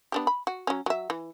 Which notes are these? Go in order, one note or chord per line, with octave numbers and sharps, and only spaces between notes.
B3 D4 G4
B5
F#4
F#3 C#4
F#3 E5
E3